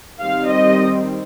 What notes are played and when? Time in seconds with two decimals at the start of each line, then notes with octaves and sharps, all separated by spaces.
0.20 D#3 G3 C4 F5
0.50 D#5